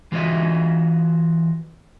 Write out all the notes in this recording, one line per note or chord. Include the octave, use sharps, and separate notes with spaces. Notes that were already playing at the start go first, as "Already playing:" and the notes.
E3 F4 F#4 D#5 E5